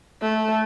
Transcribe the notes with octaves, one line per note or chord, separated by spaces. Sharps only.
A3